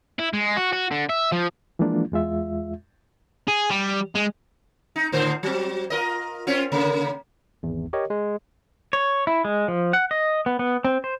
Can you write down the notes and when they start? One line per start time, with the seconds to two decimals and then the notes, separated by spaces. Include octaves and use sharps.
0.19 E4
0.33 G#3
0.57 F#4
0.73 F#4
0.91 D3
1.10 E5
1.32 F3
1.79 E3 F3 G#3 A#3 D4 F4
2.12 E2 G#3 F4 E5
3.48 G#4
3.70 G3
4.15 G#3
4.96 D#4
5.12 A2 D3 C5
5.43 F#3 C4
5.90 F4 A#4 D#5
6.47 C4 C#4 F4
6.72 C#3 A#3
7.63 G#1 E2
7.93 G4 A#4 C#5 D#5
8.10 G#3
8.93 C#5
9.27 E4
9.45 G#3
9.68 F3
9.93 F#5
10.11 D#5
10.46 B3
10.59 B3
10.85 C4
11.04 C5